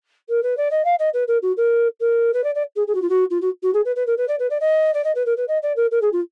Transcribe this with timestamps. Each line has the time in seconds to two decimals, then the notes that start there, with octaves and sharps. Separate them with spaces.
0.29 A#4
0.42 B4
0.57 D5
0.70 D#5
0.84 F5
0.99 D#5
1.13 B4
1.27 A#4
1.42 F#4
1.57 A#4
2.00 A#4
2.33 B4
2.43 D5
2.55 D5
2.76 G#4
2.87 G#4
2.94 F#4
3.01 F4
3.09 F#4
3.30 F4
3.41 F#4
3.62 F#4
3.73 G#4
3.85 B4
3.95 B4
4.06 A#4
4.17 B4
4.28 D5
4.39 B4
4.50 D5
4.60 D#5
4.94 D5
5.04 D#5
5.15 B4
5.26 A#4
5.37 B4
5.48 D#5
5.62 D5
5.76 A#4
5.91 A#4
6.01 G#4
6.12 F4